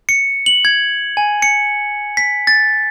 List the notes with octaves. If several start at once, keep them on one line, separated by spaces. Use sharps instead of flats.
C#7
F#7
G#6
G#5
C#7
B6
A6